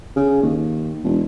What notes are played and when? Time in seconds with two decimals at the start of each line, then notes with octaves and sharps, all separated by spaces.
0.16 C#3
0.43 D#2
1.04 E1